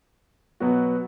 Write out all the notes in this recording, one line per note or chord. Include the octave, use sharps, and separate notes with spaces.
B2 F#3 B3 F#4